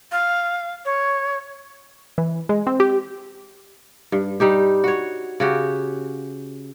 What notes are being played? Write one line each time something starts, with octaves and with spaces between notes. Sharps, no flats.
F5
C#5
E3
G#3
C4
G4
G2
G3 D#4 G4
F#4 C#5
C#3 F#4 G4